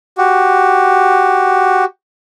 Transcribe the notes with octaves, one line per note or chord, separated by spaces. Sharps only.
F#4 G4